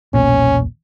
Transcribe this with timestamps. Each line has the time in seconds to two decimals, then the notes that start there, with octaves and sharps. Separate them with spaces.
0.14 E1 B1 A#2 C#4